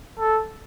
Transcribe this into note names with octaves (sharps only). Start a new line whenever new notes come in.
A4